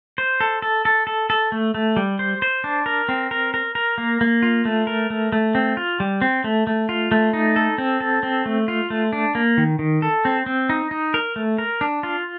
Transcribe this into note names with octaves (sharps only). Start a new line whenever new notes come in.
C5
A4
A4
A4
A4
A4
A3
A3
G3
C5
C5
D4
A#4
C4
A#4
A#4
A#4
A#3
A#3
F4
A3
A#4
A3
A3
C4
F4
G3
C4
A3
A3
F4
A3
D#4
A4
C4
A4
C4
A3
F4
A3
D4
A#3
D#3
D#3
A4
C4
C4
D#4
D#4
A#4
A3
A#4
D4
F4